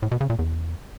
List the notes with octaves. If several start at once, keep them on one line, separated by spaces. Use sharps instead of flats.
A2
B2
C#3
A#2
E2